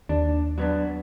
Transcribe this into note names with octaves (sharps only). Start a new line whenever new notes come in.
D#2 D4
F#3 B3 D4